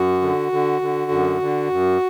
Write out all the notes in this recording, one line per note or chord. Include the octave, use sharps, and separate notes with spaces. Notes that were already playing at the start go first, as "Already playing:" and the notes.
Already playing: F#2 F#4
D3
D3
D3
F#2
D3
F#2